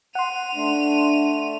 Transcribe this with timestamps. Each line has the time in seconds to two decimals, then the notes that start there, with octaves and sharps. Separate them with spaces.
0.15 F#5 C6 D#7 F7
0.55 A3 D4